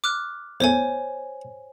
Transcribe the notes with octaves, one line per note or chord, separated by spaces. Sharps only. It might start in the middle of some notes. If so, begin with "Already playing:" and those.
D6 F6 F#6
E2 A3 C5 C#5 G#5